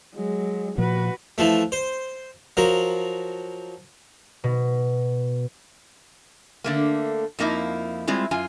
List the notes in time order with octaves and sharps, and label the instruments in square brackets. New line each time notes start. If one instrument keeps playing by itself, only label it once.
[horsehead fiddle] F#3 G#3
[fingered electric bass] A#2 F3 [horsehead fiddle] F#4 B4
[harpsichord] E3 F3 A3
C5
F3 F#3 A#4
[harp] B2
[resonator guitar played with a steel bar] D3 A3 A#3
F2 F3 A#3 D#4 E4
G3 G#3 C4 E4 F4
F#2 F4 G#5